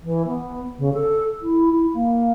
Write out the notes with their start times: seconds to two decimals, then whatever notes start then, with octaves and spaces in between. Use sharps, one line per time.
0.03 E3
0.27 B3
0.78 C#3
0.94 A4
1.42 E4
1.72 E4
1.94 A#3